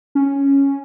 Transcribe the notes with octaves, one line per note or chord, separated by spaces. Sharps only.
C#4